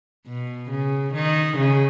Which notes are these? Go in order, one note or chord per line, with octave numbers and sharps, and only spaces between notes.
B2
C#3
D#3
C#3